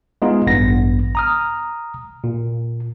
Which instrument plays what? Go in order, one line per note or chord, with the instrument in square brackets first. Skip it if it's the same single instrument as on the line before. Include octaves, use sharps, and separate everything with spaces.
[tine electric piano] G#3 B3 D#4 F4
A1 G2 B3 A#6
A#5 D#6 F6
A#2